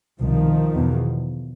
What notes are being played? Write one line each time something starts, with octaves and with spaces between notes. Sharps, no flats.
C2 B2 D#3 F3
E2 B2